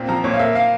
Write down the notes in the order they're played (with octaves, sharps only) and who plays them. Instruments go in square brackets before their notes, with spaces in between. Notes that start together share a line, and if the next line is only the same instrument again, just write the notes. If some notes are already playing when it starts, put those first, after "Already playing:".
Already playing: [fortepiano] A#2 C4
[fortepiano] F3 [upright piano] A#5
[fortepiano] A#2 [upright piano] C#5
[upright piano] F5
[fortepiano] A#3 [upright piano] E5
[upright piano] F5